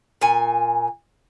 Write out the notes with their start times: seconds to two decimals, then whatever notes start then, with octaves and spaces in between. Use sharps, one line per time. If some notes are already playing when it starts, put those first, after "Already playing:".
0.21 A#2 G#5